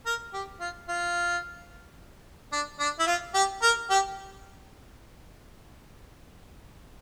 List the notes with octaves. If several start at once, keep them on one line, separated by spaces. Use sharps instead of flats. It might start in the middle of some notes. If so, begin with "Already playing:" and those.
A#4
G4
F4
F4
D4
D4
E4
F4
G4
A#4
G4